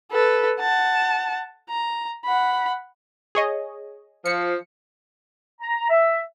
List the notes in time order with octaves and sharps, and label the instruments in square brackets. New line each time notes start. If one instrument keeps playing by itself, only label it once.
[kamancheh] A4 B4
F#5 A5
A#5
F#5 B5
[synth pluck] G#4 C#5 D#5
[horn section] F3 [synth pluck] C#7
[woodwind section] A#5
E5